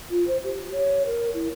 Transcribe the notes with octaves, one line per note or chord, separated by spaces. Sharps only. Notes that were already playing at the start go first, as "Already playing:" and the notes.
F4
C5
G4
C#5
A#4
E4